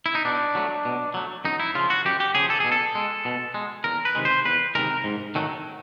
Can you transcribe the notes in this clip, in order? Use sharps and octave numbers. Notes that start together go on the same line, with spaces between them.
E4
D#4
B2 D4
F#3 A3
B2
F#3 A3
F#2 D#4
E4
C#3 F3 F4
F#4
F#2 G4
G4
C#3 F3 G#4
A4
B2 G#4
A4
G#3
B2
G#3
E2 A#4
B4
C3 D#3 G#3
C5
E2 B4
C3 D#3 G#3 A#4
G#2
D#3 F#3 A3